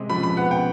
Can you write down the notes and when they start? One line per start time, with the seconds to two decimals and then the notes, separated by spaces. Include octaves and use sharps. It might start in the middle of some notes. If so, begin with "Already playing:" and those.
Already playing: C3 G#3
0.10 F3 B5
0.23 B5
0.37 B3 F#5
0.51 G5